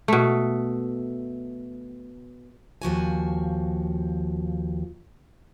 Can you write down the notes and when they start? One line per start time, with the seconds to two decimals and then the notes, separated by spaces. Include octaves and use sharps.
0.08 B2 A3
2.82 D#2 F3 F#4 G#5